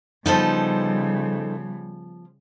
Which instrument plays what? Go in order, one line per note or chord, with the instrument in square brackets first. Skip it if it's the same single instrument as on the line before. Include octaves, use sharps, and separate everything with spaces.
[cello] C#3 G3 [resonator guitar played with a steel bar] F3 B3 [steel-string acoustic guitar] D#4 A4 C5